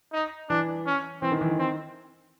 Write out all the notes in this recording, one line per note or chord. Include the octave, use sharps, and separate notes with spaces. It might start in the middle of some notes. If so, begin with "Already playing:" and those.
D#4
E3 D4
C#4
E3 C4
D#3
E3
D#3
C4